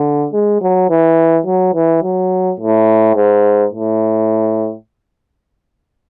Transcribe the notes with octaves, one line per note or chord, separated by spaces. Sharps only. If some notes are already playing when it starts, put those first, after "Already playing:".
Already playing: D3
G#3
F#3
E3
F#3
E3
F#3
A2
G#2
A2